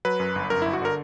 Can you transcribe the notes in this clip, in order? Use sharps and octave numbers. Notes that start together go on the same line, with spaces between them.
F#3 B4
F#2
G1
F#2 A#4
G1 E4
F#4
D3 A#4